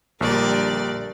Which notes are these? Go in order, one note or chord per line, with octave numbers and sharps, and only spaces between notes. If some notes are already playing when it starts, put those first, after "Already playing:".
A#1 D3 G3 A#4 D5